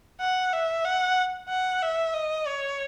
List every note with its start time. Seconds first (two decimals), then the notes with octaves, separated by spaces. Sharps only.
0.20 F#5
0.53 E5
0.85 F#5
1.49 F#5
1.82 E5
2.14 D#5
2.47 C#5